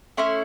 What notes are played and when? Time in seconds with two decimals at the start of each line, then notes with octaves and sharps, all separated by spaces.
0.17 A3 C#4 E4 C6